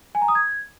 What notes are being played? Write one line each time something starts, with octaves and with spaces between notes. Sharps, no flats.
G#5
A#5
D#6
G#6